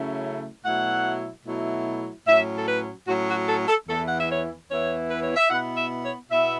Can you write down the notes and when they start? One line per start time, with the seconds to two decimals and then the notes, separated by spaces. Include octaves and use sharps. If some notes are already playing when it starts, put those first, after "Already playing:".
Already playing: C#3 F#3 A3 C#4 E4
0.65 B2 F#3 A3 E4 F#5
1.46 B2 F#3 A3 E4
2.27 A2 F#3 C#4 E5
2.57 A4
2.68 B4
3.07 A2 F#3 C#4 F#4
3.28 F#4
3.48 A4
3.68 A4
3.88 E2 E3 B3 E4 A4
4.07 F#5
4.18 E5
4.29 C#5
4.69 E2 E3 B3 E4 C#5
5.09 B4
5.22 C#5
5.36 E5
5.50 B2 B3 E4 F#5
5.77 E5
6.04 C#5
6.30 B2 B3 E4 E5